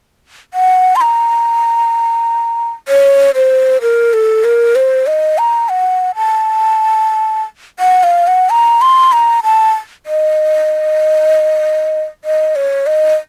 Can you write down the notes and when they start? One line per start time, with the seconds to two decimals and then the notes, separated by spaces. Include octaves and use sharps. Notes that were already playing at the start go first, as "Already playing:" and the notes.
0.54 F#5
0.96 C6
1.01 A#5
2.88 C#5
3.35 C5
3.82 A#4
4.13 A4
4.44 A#4
4.75 C5
5.07 D#5
5.38 A#5
5.69 F#5
6.15 A5
7.79 F#5
8.03 F5
8.27 F#5
8.50 A#5
8.81 C6
9.12 A#5
9.43 A5
10.06 D#5
12.24 D#5
12.56 C#5
12.86 D#5